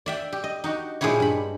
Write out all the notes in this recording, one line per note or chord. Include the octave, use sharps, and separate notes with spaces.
D5 E5 G5
G4
D#5
D#4 F#4 G4
A#2 G#3 D#4 E4 G4 C#5
G2 B5